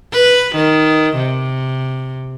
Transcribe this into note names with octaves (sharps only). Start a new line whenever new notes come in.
B4
D#3
C3